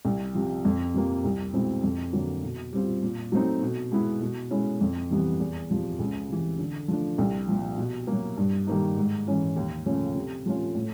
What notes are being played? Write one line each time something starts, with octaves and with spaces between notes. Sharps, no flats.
C2
C3 F3
F2
C3 F3 A#3
C2
B2 G#3 C4 E4
F2
D3 F#3 A#3
B2
G3 C4 F4
A#2
F#3 A3 C4 D#4
B2
G#3 B3 E4
B2
G#3 C#4 E4
F2
C3 E3 G3 B3
E2
C3 F3
C#2
C3 E3
D3
F3 A3 D4
C2
A#2 F3
B2
F#3 A#3
G2
D#3 G3 A#3 D#4
G#2
E3 G#3 C#4 E4
D#2
C#3 F3 A3 C#4
C3
F3 A3 C#4 F4
A2